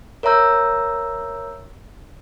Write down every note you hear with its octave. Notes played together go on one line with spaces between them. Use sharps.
A#4 C#5 E5 A#5 E6 G6